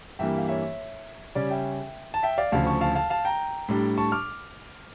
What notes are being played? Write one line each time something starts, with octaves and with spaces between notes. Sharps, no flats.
G2 E3 G3 A#3 E5 G5
F5
C#5 E5
C#3 G3 C#4 D5
E5 G5
A5
E5 G5
D5 F5
D2 C#3 F3 F5 A5
A5 C#6
F5 A5
F5 A5
F5 A5
G5 A#5
A2 G3 D4
A5 C#6
D6 F6